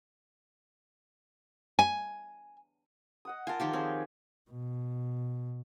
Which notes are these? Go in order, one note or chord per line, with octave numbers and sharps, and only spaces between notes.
G#5
D#5 F#5 D#6
F4 A#4 G#5 A5
D#3 F3 G4
C4 G#4 C#5
B2